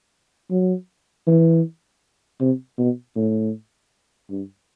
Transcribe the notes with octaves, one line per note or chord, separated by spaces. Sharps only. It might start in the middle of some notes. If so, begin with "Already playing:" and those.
F#3
E3
C3
B2
A2
G2